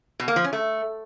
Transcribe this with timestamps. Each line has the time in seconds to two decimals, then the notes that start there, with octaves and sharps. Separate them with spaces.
0.20 B2
0.28 A#3
0.36 F3
0.44 C#4
0.53 A3